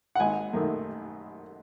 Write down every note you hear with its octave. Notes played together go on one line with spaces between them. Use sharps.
F#5
G#1 G#5
F#2 D#3 A3